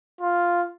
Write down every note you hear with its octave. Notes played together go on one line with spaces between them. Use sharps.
F4